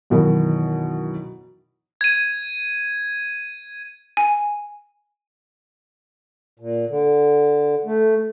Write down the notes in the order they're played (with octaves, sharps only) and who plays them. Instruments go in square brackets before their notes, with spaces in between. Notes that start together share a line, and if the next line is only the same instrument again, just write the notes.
[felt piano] F#2 B2 D#3 E3
[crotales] G#6 D#7
[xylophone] G#5
[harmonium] A#2
D3
A3